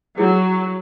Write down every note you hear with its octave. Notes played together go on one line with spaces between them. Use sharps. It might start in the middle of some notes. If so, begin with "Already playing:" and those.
F#3 E4 G#4